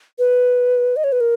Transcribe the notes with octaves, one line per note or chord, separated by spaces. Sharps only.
B4
D#5
C#5
B4
A#4